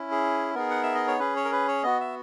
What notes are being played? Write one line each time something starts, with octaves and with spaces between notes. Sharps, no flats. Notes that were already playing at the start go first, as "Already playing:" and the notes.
Already playing: C#4 E4
G#4
B3 D#4 G#4 A#4
F#5
E5
D#5
C#5
C#4 G#4 B4
C#5
A#4
B4
C#5
B3 F#4 D#5
E5